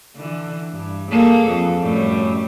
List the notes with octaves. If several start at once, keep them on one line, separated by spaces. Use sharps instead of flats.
D3 E3
G2
A#3 G#4 A4
F2
F#2 A2 G3